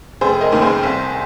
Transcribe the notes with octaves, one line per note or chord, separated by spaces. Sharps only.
F1 G#4 C5
A#4 D#5
D#2 D#3
G#4 C5
C2